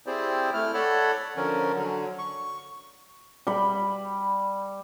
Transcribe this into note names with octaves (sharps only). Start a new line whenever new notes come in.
C4 E4 G4 G#4 C5 D5
A3 E4 F6
A4 C#5 D5 F#5 A5 B5
D3 F3 C#4 A#4
D3 F#3
C#6
G3 B5